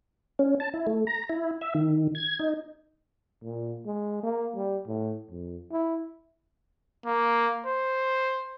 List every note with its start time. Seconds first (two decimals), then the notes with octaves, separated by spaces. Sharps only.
0.39 C#4
0.60 A5
0.74 E4
0.87 A3
1.07 A#5
1.29 E4
1.61 E5
1.75 D#3
2.15 G#6
2.39 D#4
3.43 A#2
3.86 G#3
4.23 A#3
4.56 G3
4.87 A2
5.30 F2
5.72 E4
7.06 A#3
7.66 C5